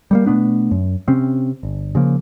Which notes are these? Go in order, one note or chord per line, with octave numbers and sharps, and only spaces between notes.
G3 A3 A#3
B2 A3 B3 D4
F#2
C3 C4 C#4
G1
C#3 F3 A#3